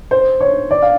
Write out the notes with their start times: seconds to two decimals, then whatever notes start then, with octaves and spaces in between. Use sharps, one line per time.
0.11 C5
0.41 C#5
0.71 D5
0.82 F5